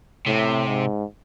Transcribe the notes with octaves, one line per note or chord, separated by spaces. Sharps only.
A2 C3
G#2